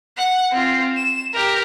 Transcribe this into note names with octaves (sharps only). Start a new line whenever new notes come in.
F#5
C4 F4
E7
G4 A#4